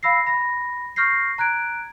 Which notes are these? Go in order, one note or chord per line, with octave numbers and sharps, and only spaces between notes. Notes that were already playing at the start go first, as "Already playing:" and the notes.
F5 B5 E6 A#6 C7
B5 A#6
C#6 F6 G6 A#6 C7
A#5 F#6 G#6 D7